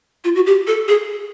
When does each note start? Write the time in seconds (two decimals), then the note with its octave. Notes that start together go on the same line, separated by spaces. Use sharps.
0.24 F4
0.35 F#4
0.46 G4
0.67 A4
0.88 G#4